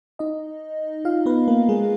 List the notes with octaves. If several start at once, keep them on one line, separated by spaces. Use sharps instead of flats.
D#4 D#5
F4 F5
B3 B4
A#3 A#4
G#3 G#4